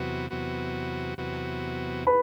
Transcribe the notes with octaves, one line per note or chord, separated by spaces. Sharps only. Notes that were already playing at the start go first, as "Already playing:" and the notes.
Already playing: E2 C3 F#3 B3 F#4
E2 C3 F#3 B3 F#4
E2 C3 F#3 B3 F#4
B4 B5